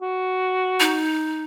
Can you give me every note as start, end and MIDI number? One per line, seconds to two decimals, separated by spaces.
0.02 1.04 66
0.80 1.44 63